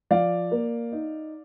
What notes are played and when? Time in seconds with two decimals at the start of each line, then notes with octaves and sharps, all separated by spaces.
0.11 F3 D5 F5
0.52 A#3
0.92 D#4